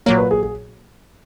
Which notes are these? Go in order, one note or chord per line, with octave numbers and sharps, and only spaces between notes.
A#2 F#3 A#3 C#5
B4
G#4
G#4